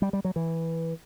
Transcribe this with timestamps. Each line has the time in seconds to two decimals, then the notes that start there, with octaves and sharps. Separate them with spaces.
0.02 G3
0.13 G3
0.25 F#3
0.36 E3